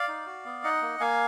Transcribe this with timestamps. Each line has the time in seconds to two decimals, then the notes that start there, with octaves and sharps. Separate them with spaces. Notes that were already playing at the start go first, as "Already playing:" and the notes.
Already playing: D5 F5
0.08 D#4
0.27 F#4
0.45 B3
0.64 D#4 D#5 F#5
0.82 A#3
1.00 A#3 F5 G#5